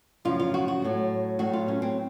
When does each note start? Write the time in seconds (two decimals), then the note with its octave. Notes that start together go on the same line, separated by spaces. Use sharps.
0.25 F#2 C#3 F3 F4
0.40 F4
0.54 F#4
0.68 F#4
0.82 A2 F#3 A3
1.39 A2 F#3 A3 F#4
1.53 F4
1.68 C#4
1.82 C4